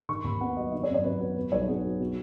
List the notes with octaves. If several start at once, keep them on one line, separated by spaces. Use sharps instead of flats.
D#3 C#6
D#2 B5
B3 F#5
F#3 D#5
D#3 D#5
C#5
F#2
C#5
F#2 B4
B3 B4
B2 B4
B1 C#5
B3 G#4
F#3
B2